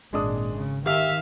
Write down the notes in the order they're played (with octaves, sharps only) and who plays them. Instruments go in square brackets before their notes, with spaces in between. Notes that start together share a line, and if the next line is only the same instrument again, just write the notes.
[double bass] G#1 A#2 [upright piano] G#3 D4 D#6
[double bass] C#3
[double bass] D#3 [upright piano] G4 [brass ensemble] E5 [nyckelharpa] F5